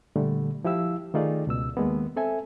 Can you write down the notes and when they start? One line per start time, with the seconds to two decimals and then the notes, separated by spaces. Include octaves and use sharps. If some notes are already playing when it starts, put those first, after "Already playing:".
0.16 A#2 D3 G3 A3
0.64 F3 E4 G4 F5 E6
1.14 D#3 A3 D#4 F4 G#4 D5
1.47 C#2 B2 E6
1.77 D#2 D#3 G#3 A#3 B3
2.16 C4 A4 E5 G#5